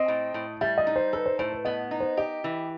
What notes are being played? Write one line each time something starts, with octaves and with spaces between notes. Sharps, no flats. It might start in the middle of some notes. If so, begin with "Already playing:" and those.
Already playing: C4 D#5
A2
A2
G3 E5
D#5
D#4
C5
A4 B4
C5
A2 C5
B4
B3 D#5
D#4
C5
G4 D#5
E3